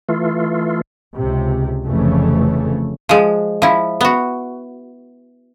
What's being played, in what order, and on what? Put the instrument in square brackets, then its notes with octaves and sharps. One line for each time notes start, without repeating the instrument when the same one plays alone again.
[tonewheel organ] E3 A3 F4
[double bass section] C#2 C3
F1 F2 C#3 E3 A3
[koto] F3 G#3
F3 E4
B3 F#4